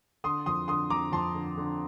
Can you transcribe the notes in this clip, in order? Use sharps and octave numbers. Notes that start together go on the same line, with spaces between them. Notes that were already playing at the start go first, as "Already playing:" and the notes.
D3 C6 D#6
F2 C6 D#6
D3 C6 D#6
F2 A#5 D6
F2 A5 C6
D3
D3